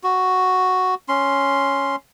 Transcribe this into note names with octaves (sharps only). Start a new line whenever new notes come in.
F#4
C#4 C6